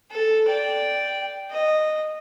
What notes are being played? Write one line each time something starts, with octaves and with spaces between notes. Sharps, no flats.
A4
D5 G5
D#5